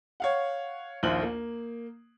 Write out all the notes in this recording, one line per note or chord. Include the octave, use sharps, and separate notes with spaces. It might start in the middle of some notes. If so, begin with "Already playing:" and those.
C#5 F5 F#5
A#1 D#2 E4 C5 F#7
A#3